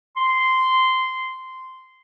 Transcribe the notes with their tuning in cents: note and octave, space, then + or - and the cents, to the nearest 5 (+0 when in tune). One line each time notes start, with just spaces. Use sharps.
C6 -10